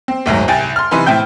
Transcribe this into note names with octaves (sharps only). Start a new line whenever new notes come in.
C4
F#1 D2 G#2 F#3
C2 G5 G#5 A6
C6 F6
C3 E3 D#4 B4 C6
A2 C4 E4 G5 G6